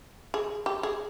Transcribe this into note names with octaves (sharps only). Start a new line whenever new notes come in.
G#4
G4
G#4